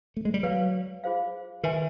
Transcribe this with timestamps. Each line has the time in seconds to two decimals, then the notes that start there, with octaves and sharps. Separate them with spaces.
0.17 A3
0.25 G#3
0.34 G3
0.43 F#3 B4 D5 F5
1.04 F4 G#4 C5 F5
1.63 D#3 B4 E5 G#5 C6